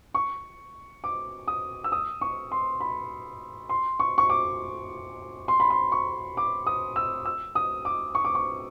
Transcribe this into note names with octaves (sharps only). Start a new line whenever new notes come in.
C#6
D6
D#6
E6
D#6
C#6
C6
B5
C6
C#6
C#6
D6
C6
B5
C6
C#6
D6
D#6
E6
E6
D#6
D6
C#6
D6
C#6